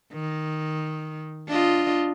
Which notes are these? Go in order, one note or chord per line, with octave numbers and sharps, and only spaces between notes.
D#3
D4 F4 D#5